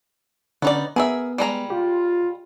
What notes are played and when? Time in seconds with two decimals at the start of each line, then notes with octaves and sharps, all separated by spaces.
0.62 D3 B3 C#4 D#4 D5
0.96 B3 G#4 A#4 E5
1.38 G3 G#3 A#5
1.70 F4 G4